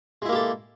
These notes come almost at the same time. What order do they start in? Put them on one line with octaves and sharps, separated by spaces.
G#3 E4 A#3 G4 A4